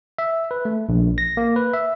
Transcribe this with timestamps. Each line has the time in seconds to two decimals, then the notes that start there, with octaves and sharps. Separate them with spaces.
0.18 E5
0.51 B4
0.65 A3
0.89 A#1
1.18 A#6
1.37 A#3
1.56 B4
1.74 E5